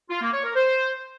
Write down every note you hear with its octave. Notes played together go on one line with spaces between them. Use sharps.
F4
A#3
C#5
A#4
C5